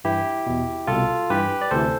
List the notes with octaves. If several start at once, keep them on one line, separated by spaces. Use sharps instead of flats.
G2 E3 E4 G4
E2 B2
C2 B2 F4 A4
G2 E3 G4 B4
D5
D2 C3 E3 A4 C5